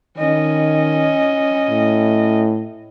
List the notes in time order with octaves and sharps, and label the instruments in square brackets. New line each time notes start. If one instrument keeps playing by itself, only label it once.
[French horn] D#3 [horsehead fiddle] C#4 D#5
[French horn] A2